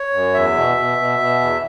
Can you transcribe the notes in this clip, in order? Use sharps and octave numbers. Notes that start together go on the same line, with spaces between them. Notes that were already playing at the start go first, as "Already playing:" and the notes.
Already playing: C#5
F#2
E2 E5
B2
B2
B2
B2
E2